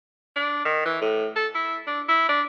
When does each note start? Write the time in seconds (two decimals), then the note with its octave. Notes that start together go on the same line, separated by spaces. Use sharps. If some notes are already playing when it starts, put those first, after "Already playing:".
0.36 D4
0.65 D#3
0.85 E3
1.01 A2
1.36 A4
1.55 E4
1.87 D4
2.09 E4
2.29 D4